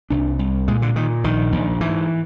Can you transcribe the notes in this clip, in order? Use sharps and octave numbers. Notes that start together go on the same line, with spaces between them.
C2 D4
C2
A#2 G#3
D3
A#2 D#3
A#1 D#3
A#1
G#2 E3